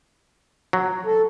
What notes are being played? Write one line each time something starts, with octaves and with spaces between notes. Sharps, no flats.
F#3
A4